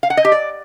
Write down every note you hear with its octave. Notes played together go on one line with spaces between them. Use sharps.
F5
F#5
D#5
G4
D5